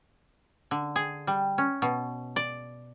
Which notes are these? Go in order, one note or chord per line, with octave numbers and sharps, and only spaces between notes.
D3
G#4
G3
C#4
B2
D5